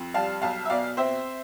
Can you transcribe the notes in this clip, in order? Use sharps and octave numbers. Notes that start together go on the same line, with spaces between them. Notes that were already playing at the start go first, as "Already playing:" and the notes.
Already playing: F2
G3 F5 A5
B1 F5 A5
E5
B2 D5 F5
C4 C5 E5